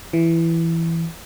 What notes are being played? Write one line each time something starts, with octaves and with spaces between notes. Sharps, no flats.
E3